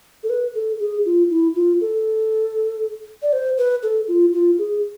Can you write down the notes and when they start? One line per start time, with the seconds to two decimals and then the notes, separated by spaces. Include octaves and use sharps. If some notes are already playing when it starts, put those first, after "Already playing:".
0.23 A4
0.30 B4
0.55 A4
0.80 G#4
1.06 F4
1.30 E4
1.56 F4
1.81 A4
3.22 D5
3.33 C5
3.58 B4
3.83 A4
4.08 F4
4.33 F4
4.58 G#4